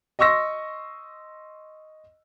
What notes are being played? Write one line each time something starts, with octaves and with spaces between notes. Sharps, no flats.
D#5 C6 C#6 E6 A#6